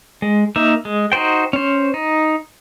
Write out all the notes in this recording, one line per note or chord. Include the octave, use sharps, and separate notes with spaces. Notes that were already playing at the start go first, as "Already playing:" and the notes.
G#3
A#3 D#4 E5
G#3
D#4 F#4 C5 G5
C#4 C5
D#4